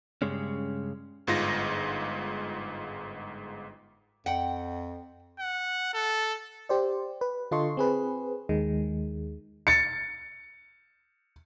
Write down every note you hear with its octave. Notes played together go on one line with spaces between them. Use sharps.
G2 C#3 G#3 C#4
G1 G#2 F4 A#6
F2 F#5 G5
F#5
A4
G4 C5 D5
B4
D3 F4 A4 D#5 C6 C#6
C4 G#4 B4
D#2 D#3 G#3
A6 C#7